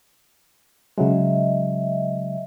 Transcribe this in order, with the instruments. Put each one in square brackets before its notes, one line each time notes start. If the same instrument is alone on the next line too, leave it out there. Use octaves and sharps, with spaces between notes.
[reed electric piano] C#3 F#3 G#3 [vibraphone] D#5 E5